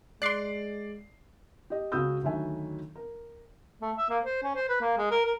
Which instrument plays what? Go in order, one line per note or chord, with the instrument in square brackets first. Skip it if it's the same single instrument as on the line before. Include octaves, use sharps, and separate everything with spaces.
[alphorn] G#3 [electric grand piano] D5 C7 [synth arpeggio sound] C6 D6 F#6
[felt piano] G4 D#5
C#2 F#4 B5 D#6 E6 G6
D2 D#3 F#3 F#4 E5 G#5
A#4
[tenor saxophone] A3
E5
A#3
C5
C#4
C5
B4
A#3
G#3
A#4
A#4